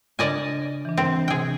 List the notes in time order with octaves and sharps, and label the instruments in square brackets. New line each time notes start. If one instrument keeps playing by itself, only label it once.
[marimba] C#3 D4 [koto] D5 D#5 G#5
[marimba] E3 D4
[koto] C4
[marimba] C3 [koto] G#4 G5